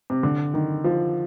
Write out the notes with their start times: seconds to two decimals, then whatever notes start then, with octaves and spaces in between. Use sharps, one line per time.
0.10 C3
0.23 D3
0.54 D#3
0.84 F3